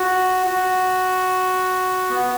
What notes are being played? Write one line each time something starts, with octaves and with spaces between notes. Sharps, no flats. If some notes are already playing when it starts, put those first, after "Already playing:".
Already playing: F#4
F#4
B3